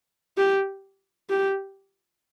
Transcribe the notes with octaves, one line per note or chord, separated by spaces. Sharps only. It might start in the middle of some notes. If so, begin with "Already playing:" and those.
G4
G4